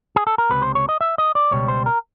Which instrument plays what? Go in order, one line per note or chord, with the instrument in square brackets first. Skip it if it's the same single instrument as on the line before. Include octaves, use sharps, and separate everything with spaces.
[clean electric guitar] G#4
A4
A#4
C#2 C3 B4
C5
C#5
D#5
E5
D#5
D5
C#2 B2 G3 C#5
C5
A#4